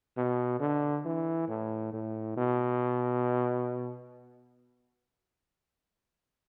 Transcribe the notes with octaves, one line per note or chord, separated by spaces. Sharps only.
B2
D3
E3
A2
A2
B2